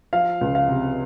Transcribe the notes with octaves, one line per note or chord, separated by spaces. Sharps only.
F3 F5
C#2
F5
C3